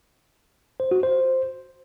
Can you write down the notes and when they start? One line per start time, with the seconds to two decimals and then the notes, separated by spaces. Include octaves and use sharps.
0.80 C5
0.91 F#4
1.03 C5